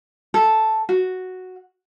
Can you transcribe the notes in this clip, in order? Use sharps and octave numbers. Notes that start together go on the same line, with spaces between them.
A4
F#4